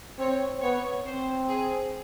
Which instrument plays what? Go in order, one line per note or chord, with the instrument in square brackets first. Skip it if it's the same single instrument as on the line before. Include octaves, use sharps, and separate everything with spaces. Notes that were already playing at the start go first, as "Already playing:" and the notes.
[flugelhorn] C4 [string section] C#5
[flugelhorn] B3 [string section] C#5
[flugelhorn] C4 [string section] C5
[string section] G#4